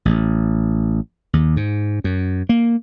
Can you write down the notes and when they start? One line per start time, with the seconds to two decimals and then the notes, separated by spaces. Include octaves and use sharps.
0.05 A1
1.33 D#2
1.56 G#2
2.04 F#2
2.49 A#3